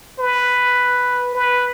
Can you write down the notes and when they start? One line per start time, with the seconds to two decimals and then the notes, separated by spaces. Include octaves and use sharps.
0.19 B4
1.35 B4